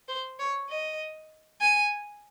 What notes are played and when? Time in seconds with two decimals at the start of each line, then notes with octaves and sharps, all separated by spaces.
0.08 C5
0.39 C#5
0.69 D#5
1.61 G#5